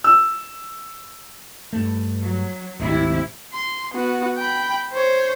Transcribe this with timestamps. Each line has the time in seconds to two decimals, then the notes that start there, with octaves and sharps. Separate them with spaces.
0.04 E6
1.73 G2 A3
2.21 F#3
2.79 D1 G#1 C3 E4
3.53 C6
3.93 B3 F#4
4.38 G5 B5
4.93 C5 C#5